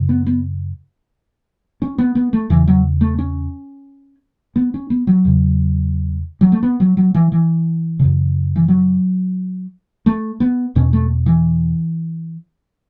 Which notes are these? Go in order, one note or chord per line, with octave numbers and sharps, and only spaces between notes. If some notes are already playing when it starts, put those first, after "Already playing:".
Already playing: F#2 C#3
B3
B3
C#4
B3
B3
A3
E2 C#3 E3
F#3
A3
C#4
B3
C#4
B3
F#3
E2 C#3
F#3
A3
B3
F#3
F#3
E3
E3
F#2 C#3
E3
F#3
A3
B3
E2 B2 C#4
A3
E3